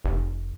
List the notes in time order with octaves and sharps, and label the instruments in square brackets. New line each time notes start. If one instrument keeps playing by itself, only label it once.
[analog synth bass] F1